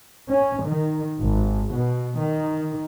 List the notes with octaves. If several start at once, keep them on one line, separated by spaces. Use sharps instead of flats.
C#4
D#3
G#1
B2
D#3